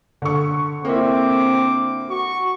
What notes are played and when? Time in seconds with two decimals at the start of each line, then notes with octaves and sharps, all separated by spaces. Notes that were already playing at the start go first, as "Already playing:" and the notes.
0.22 D3 C#6
0.85 A#3 C4 E4 D6
2.10 F#4 C#6